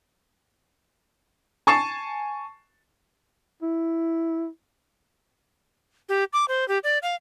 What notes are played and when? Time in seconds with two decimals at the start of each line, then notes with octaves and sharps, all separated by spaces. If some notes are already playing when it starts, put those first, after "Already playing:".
1.67 G#5 A5 C#6 A6 C7 E7
3.62 E4
6.09 G4
6.33 D6
6.48 C5
6.68 G4
6.84 D5
7.02 F5